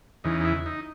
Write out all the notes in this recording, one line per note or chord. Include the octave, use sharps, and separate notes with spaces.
E2 C#3 E3 D#4
D#4
E4
D#4